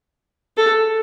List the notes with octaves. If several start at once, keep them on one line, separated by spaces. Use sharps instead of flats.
A4